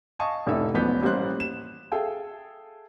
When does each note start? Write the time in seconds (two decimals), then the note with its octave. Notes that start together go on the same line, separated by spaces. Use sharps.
0.19 D#5 F5 G#5 A5 C#6 D#6
0.47 F1 A2 D#4 E5
0.74 E1 A1 F3 B3 G6 B6
1.02 A1 G3 A#3 C5 F#6
1.40 E7
1.92 G#4 A4 E5 F5 G5 G#5